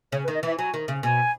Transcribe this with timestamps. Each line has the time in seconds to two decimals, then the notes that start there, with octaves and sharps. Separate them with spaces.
0.12 C#3 C#5
0.24 B4
0.28 D#3
0.35 D#5
0.43 E3 E5
0.57 F#3 G#5
0.74 D#3
0.88 C#3
1.03 B2 G#5